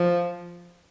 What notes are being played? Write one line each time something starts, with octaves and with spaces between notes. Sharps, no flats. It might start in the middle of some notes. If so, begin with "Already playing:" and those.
Already playing: F3